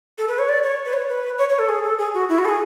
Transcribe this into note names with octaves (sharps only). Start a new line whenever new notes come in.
A4
B4
C#5
D5
C#5
B4
C#5
B4
C#5
C#5
A4
G#4
A4
G#4
F#4
E4
F#4
A4
G#4